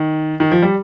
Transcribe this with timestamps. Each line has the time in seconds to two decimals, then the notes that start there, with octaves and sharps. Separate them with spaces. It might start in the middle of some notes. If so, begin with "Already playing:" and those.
Already playing: D#3
0.40 D#3
0.51 F3
0.63 G3